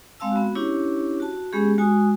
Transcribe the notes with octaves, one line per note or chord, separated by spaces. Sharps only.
G#3 C4 F5 A5 E6
B3 F#4
C#4 D4 E4 G4 C#5
F#4 A5
G#3 B3 C#4 G4 G#4
G#3 F#4 G#5 D#6